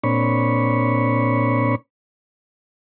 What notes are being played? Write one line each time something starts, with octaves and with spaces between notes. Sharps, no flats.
A#2 C4 D4 C#5 B5 C#6